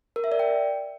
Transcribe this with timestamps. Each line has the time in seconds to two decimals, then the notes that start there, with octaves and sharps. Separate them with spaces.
0.16 A#4
0.24 E5
0.32 D5
0.39 G5